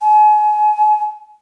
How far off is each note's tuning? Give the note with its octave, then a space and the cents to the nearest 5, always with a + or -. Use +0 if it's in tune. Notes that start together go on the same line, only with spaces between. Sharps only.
G#5 +35